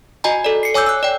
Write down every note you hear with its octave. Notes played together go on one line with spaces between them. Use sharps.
F#4 D#5 G#5 A#5
A4 D5
C7 C#7
C#5 G#5 D6 E6 G6
E6 F#6
D5 G5